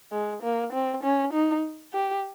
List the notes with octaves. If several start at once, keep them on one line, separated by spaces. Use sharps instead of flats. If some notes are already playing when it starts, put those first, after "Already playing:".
G#3
A#3
C4
C#4
D#4
G4